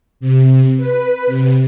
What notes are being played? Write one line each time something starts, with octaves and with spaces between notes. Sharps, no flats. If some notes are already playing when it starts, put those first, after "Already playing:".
C3
B4
C3